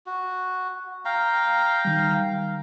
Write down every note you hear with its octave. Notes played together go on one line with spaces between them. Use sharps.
F#4
F5 G5 A#5
D#3 G3